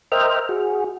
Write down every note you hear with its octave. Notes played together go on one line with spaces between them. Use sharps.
A#4 C5 D#5 E5 G5 F6
F#4 G#4